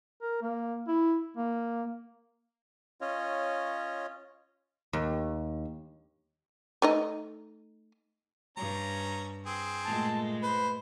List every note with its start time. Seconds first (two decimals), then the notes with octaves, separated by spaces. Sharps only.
0.22 A#4
0.42 A#3
0.88 E4
1.37 A#3
3.01 C#4 F4 C#5 D#5
4.93 D#2
6.82 A3 D#4 D#5
8.57 G2 C#4 A#5
9.46 C4 G#4
9.85 A#2 G#3 A3 A5
10.43 B4 C5